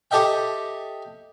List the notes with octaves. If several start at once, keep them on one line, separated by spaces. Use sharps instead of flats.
G4 A4 D#5 E5 G5